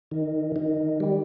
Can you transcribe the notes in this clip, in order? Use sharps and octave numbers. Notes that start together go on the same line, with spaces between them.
D#3
D#3
G3